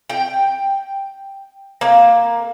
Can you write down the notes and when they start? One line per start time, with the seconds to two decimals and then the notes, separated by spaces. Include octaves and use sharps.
0.09 G5
1.81 A#3